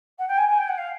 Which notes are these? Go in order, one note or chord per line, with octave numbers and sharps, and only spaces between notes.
F#5
G5
G#5
G#5
G5
F#5
F5